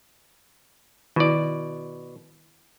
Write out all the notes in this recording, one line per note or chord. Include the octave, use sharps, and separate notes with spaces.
B2 D#3 E4 F#4 D5